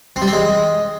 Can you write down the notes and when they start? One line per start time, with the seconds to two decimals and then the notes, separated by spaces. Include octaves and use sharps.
0.16 C4
0.22 G3
0.27 C4
0.33 G#3